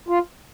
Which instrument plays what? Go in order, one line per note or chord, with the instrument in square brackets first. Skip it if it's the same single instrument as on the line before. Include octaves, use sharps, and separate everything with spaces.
[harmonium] F4